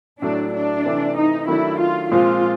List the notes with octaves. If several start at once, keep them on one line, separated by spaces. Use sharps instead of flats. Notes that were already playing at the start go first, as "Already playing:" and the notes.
A2 F#3 A3 D4
D4
C3 E3 A3
D#4
D#3 F#3 A3 D4 E4
F4
A#2 F3 G#3 C4 F4